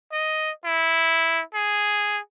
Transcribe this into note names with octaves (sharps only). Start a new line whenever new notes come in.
D#5
E4
G#4